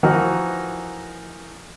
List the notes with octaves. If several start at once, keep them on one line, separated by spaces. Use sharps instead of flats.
E3 F3 D#4 F#4 A#4